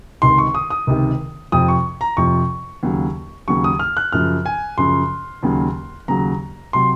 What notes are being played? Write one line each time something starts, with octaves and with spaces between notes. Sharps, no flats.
C#2 C3 D#3 C6
C#6
D#6
D#6
C#2 C3 D#3
F2 C3 F3 D#6
C#6
A#5
F2 C3 F3 C#6
D#2 C#3 F#3
D#2 C#3 F#3 C#6
D#6
F6
F#6
F#2 C#3 F3 F6
G#5
F#2 C#3 F3 C6
D#2 C#3 F#3
D#2 C#3 F#3 A#5
C3 F#3 C6